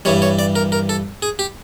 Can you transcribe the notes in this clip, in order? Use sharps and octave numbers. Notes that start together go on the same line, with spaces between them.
G2 E3 G3 C#5
C#5
D5
A#4
A#4
A4
G#4
G4